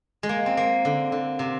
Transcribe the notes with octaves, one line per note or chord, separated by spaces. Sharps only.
G#3
A#3
C4
A#3
D3
D3
C3